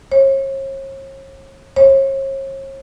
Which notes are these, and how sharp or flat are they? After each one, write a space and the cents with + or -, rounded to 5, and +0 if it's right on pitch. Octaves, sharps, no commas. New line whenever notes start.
C#5 -40
C#5 -40